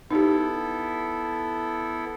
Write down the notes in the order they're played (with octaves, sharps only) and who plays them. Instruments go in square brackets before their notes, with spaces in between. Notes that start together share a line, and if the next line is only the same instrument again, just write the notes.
[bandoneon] B3 E4 A4 [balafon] D#4 G4